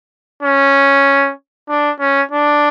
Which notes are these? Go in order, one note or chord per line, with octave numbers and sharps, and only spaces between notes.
C#4
D4
C#4
D4